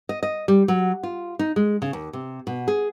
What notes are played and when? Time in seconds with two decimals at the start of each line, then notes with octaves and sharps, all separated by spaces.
0.09 D#5
0.23 D#5
0.48 G3
0.68 F#3
1.03 F4
1.39 D#4
1.56 G#3
1.82 C#3
1.93 D#2
2.13 C3
2.47 B2
2.68 G#4